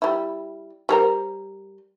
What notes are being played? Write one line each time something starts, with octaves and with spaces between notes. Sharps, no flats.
G3 E4
G3 A#4 C5